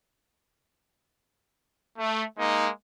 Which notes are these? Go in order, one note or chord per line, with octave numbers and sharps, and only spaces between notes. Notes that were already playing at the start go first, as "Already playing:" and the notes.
A3
G#3 A#3 D#4